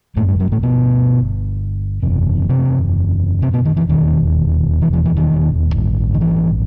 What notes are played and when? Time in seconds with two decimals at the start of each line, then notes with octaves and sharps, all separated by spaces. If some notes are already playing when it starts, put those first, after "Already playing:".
0.16 G1 F#2 A2 A3
0.28 G2 G3
0.40 F#2 F#3
0.52 A2 A3
0.63 B2 B3
2.03 F#1 E2 C3
2.49 C3 C4
3.42 C3 C4
3.53 B2 B3
3.65 D#3
3.77 E3
3.89 E1 D#2 D#3
4.82 E3
4.93 E3
5.05 E3
5.17 D#3
5.75 A1 G2
6.14 D#3
6.21 E3